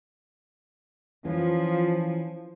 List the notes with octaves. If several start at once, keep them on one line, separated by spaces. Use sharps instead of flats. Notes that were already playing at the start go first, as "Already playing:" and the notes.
E3 F3 C#4